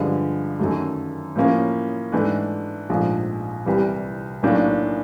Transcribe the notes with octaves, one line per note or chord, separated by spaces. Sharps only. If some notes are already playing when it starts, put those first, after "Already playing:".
Already playing: G2 D3 F3 G#3
F#2 D#3 F#3 A3
A2 F3 A#3 C#4
G#2 E3 A3 D4
A#1 G#2 F3 A3
C2 C3 E3 G3
B1 A2 F#3 A#3 D4